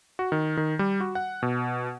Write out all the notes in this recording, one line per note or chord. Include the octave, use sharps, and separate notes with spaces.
F#4
D#3
D#3
G3
F#4
F#5
B2